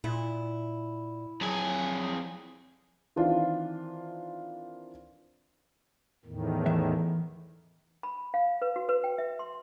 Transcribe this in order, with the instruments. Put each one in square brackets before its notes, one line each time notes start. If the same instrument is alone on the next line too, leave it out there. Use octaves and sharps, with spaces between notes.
[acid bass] A#2 [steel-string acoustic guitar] E4
[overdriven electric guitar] F2 G#4 [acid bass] F#3
[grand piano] D#3 E3 C4 D4 F4
[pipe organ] E2 A2 D#3
[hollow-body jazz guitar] E3 E5
[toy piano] B5
F5
B4
F#4
B4
G5
E5
C6